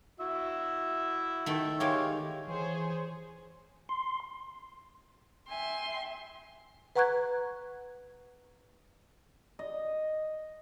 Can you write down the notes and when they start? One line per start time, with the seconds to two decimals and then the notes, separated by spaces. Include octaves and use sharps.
0.20 E4 F#4 E5
1.46 D#3 A3
1.80 D#3 G#3 G4 C#5 F5
2.48 E3 G#4 C5 C#5
3.89 C6
5.49 E5 G5 G#5 C6
6.96 B4 F#5 A#5 C#6 F#6 G#6
9.59 D#5